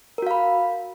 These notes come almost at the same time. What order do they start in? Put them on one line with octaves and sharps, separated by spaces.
A#4 F#4 F5 B5